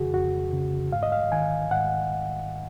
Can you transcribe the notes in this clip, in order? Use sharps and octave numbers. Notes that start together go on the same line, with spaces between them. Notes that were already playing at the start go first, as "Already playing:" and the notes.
Already playing: F2 C#3 F#4 G#4
F2 F#4
C#3
G#2 F5
D#5
F5
D#3 G#5
G#2 F#5